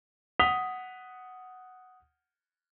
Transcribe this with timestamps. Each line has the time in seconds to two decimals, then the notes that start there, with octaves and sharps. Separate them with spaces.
0.39 F#5 D#6 B6 F7 G7